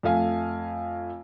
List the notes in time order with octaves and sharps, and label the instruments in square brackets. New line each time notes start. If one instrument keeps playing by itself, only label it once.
[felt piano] F2 A3 F5 G#5